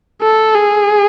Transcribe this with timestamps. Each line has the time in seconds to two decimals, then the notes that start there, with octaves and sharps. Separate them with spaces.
0.22 A4
0.55 G#4